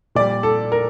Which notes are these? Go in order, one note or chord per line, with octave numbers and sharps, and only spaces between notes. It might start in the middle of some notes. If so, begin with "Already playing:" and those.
A#2 G3 D5
A4
A#4